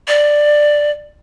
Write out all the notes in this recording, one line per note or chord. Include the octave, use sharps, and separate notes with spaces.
D5